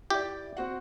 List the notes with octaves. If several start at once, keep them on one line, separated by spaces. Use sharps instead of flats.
E4 G4 D5
C4 F#4 F#5